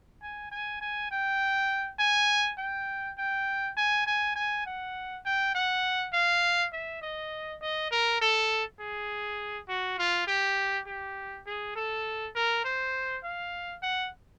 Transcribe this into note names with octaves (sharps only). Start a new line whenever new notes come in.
G#5
G#5
G#5
G5
G#5
G5
G5
G#5
G#5
G#5
F#5
G5
F#5
F5
E5
D#5
D#5
A#4
A4
G#4
F#4
F4
G4
G4
G#4
A4
A#4
C5
F5
F#5